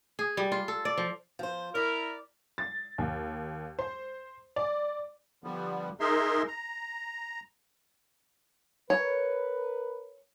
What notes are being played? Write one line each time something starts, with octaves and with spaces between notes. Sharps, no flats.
G#4
G3
F4
A4
D5
F3
F3 C5
E4 A#4 D5
A6
D#2
C5
D5
D3 F3 G3 B3
D#4 G#4 A#4 E5 C6
A#5
A#4 B4 C#5